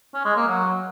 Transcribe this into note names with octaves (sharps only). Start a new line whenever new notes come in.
C#4
G#3
A#3
F#3